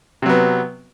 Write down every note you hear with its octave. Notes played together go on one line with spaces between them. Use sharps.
C3 F#3 B3